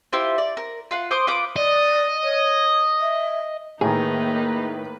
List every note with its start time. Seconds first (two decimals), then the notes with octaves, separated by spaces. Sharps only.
0.13 E4 F4 G4 C5
0.38 D5
0.57 A#4
0.91 F4 F5 F#5
1.11 C5 C6 D6 D#6
1.27 F4 B4 D6 D#6
1.56 D5 D#5
2.24 C#5
3.01 E5
3.81 A2 D#3 A#3 D#4 G#4 B4